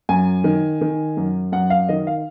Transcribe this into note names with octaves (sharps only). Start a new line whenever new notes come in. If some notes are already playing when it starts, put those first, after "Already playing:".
F#2 G#5
D#3
D#3
F#2
F#2 F#5
F5
D#3 D#5
F5